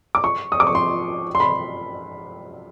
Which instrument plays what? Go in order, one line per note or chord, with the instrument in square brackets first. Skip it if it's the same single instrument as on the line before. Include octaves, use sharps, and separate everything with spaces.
[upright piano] D6
C#6
D#6
D6
C#6
C6
C6
B5